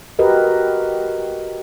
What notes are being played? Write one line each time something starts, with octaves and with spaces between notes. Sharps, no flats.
F#4 G4 A#4 B4 D#5